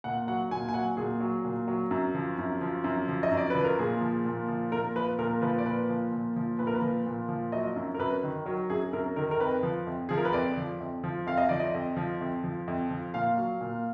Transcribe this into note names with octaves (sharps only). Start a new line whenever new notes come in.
A#2 F#5
F#3 F#5
A#2 G#5
G#5
F#3 F#5
A#2 G#4
F#3
A#2
F#3
F#2
F3
F#2
F3
F#2
F3
D#5
F#2
D5
F3 B4
A#4
A#2 G#4
F3
A#2
F3
A#2 A#4
F3 B4
A#2 A#4
F3 B4
D5
A#2 B4
F3
A#2
F3
A#2 B4
A#4
B4
F3
A#2
F3
F#3 D#5
F#2
A#4
F#2 B4
D#3
F#3 A#4
F#2 G#4
F#2 A#4
D#3 A#4
A#4
F2 B4
F3
F2
F3 G#4
A#4
B4
F2 D5
F3
F2
F3
F2 F5
D#5
F3 D5
D#5
F2
F3
F2
F3
F2
F3
A#2 F5
F#3
A#2